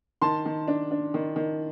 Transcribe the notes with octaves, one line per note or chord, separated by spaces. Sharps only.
D#3 A5 C6
D#3
D4
D4
D#3
D#3